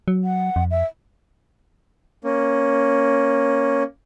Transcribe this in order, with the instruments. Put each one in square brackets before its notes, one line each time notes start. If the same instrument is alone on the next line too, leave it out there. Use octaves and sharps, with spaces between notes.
[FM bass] F#3
[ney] F#5
[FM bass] F2
[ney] E5
[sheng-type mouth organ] A#3 C#4